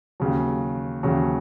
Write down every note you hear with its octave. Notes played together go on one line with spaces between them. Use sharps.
D#2 C#3 F#3
D#2 C#3 F#3